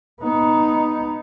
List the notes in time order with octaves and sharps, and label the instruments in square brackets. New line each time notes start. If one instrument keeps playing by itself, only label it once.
[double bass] B3 D#4